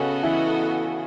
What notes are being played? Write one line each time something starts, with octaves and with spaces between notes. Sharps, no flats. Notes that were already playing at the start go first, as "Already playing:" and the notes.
Already playing: C#3 B3 C#4 F#4 A4 D#5
E3 E4